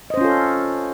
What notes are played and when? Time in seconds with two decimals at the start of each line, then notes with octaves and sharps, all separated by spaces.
0.10 D#5
0.14 C5
0.17 C#4
0.21 F4
0.24 A4